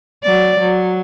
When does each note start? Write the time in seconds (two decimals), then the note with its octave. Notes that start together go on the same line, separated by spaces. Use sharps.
0.23 F#3 D5
0.59 F#3